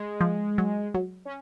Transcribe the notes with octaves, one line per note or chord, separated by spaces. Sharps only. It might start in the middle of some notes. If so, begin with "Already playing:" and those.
Already playing: G#3
F3
F#3
F#3
C#4